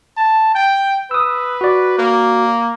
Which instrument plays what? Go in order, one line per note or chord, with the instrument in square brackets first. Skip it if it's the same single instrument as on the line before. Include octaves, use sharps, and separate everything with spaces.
[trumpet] A5
G5
[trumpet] B4 [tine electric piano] D#6 E6
[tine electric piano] F#4 D5
[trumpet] A#3